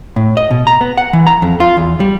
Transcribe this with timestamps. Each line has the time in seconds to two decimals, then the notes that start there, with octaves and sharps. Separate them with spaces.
0.16 A2
0.37 D#5
0.51 B2
0.67 A#5
0.81 B3
0.98 F#5
1.13 E3
1.27 A#5
1.42 F2
1.60 F4
1.77 E2
2.00 G3